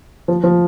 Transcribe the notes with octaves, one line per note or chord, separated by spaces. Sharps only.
F3
F3